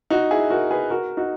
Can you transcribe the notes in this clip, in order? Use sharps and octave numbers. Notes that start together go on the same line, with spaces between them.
D#4 F#4
E4 G#4
F#4 A#4
G#4 B4
F#4 A#4
D#4 F#4